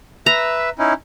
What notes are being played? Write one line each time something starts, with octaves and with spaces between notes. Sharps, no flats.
B4 E5 A#5
C#4 D#4 E4